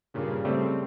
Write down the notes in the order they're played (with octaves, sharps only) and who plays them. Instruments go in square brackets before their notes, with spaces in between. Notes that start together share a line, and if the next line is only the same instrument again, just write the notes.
[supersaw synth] G2 A#2 C#3
[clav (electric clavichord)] C#3 G3 A3 [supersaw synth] C4